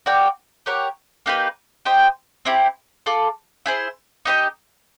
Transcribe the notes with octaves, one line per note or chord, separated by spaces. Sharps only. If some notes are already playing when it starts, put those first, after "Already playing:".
F#4 A#4 D5 G5
G4 A#4 C#5 F#5
A#3 D#4 G4 B4
G4 C5 D#5 G5
C4 E4 G4
F4 A4 D5
E4 G#4 C5
D#4 G4 C5 D#5